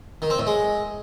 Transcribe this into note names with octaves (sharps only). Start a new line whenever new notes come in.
D#3
C4
A2
G#3